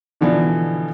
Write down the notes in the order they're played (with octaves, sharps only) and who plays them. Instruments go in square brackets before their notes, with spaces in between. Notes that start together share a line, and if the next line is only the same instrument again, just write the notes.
[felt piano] B2 D3 E3 F3 D4